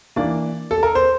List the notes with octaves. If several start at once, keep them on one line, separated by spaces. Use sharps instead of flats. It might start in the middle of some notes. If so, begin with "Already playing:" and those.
E3 A#3 D4 D5
A4
A#4
C5